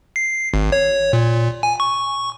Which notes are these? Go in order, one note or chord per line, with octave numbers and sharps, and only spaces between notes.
C7
G#1
C#5
A#2
G#5
C#6